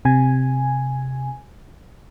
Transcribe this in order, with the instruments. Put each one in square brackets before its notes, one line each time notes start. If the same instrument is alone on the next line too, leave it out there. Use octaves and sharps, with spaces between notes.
[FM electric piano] C3 G#5